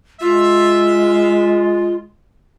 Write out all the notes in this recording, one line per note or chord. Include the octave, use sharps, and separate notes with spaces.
G#3 F4 E5